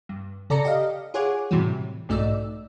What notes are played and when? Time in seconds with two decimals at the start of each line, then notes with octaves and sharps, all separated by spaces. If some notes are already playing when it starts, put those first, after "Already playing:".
0.09 G2
0.50 C#3 A4 D5 A#5 A#6 C#7
0.65 G4 D#5 F5
1.14 F4 G#4 C#5 F#5 G#5 D6
1.51 A2 C3 E3 F#3 G3
2.09 B1 G#2 A3 D#4 D5 E6